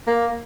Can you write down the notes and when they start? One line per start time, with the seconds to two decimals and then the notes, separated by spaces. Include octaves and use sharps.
0.07 A#3